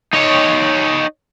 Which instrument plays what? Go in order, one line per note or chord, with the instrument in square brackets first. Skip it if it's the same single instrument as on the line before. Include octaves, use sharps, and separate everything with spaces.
[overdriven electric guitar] D#4 C#5